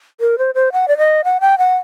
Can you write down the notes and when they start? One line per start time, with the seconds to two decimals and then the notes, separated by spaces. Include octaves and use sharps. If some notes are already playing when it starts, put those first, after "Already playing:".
0.21 A#4
0.38 C5
0.55 C5
0.72 F#5
0.88 D5
0.98 D#5
1.24 F#5
1.41 G5
1.58 F#5